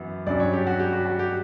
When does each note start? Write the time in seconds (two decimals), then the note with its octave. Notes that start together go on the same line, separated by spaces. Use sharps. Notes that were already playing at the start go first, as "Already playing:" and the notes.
Already playing: F#2 E3 B3
0.27 G2 F#3 C#4 D5
0.40 C#5
0.53 G4
0.67 F#4
0.79 G4
0.93 F#4
1.06 F#4
1.19 G4